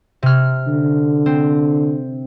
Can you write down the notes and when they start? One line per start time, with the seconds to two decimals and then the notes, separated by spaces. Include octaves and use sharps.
0.23 C3 F6
0.68 D3
1.26 C4